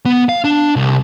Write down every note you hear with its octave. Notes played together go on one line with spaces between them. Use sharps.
B3
F5
D4
C2